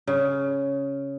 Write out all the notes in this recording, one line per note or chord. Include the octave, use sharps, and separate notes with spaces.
C#3